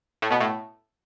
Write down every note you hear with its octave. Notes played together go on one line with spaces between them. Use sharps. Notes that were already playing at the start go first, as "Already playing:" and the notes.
A2 A3
B2 B3
A2 A3